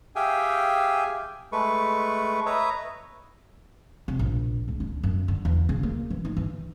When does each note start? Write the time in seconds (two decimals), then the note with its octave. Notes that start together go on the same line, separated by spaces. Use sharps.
0.16 G4 G#4 E5 F5 G5 G#5
1.52 G#3 A3 B4 C#6
2.46 B4 C#5 D#5 E5 A#5
4.08 C3
4.19 A#1
4.68 C#2
4.80 D4
5.03 F#2
5.28 D3
5.45 E2
5.69 C#3
5.83 A#3
6.10 E3
6.25 D#4
6.37 E3